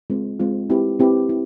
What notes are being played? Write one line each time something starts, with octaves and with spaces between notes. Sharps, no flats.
G#3 C4 F4
G#3 C4 F4
C4 E4 G4 B4
C4 E4 G4 B4
E4